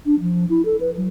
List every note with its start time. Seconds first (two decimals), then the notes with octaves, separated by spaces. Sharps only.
0.06 D4
0.20 F3
0.50 E4
0.65 A4
0.80 B4
0.97 F#3